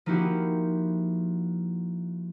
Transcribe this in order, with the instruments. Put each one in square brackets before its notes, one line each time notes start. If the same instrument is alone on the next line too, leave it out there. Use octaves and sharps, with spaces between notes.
[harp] F3 A#3 D#4 E4 F#4 G4